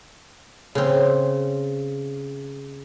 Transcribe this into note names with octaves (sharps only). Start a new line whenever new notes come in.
C#3 C4